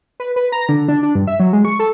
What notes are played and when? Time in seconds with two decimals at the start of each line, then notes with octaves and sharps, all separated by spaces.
0.20 B4
0.36 B4
0.52 A#5
0.69 D3
0.88 D4
1.03 D4
1.15 G2
1.27 E5
1.40 F#3
1.53 G#3
1.65 C#6
1.80 A4